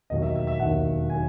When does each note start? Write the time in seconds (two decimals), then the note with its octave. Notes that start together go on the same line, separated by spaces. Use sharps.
0.10 E1 D#2 D#3 F#3 D#5
0.22 E5
0.35 E5
0.47 E5
0.59 E1 D#2 D#3 F#3 F#5
1.10 D#3 F#3 G#5